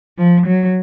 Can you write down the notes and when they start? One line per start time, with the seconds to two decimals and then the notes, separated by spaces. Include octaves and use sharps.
0.18 F3
0.47 F#3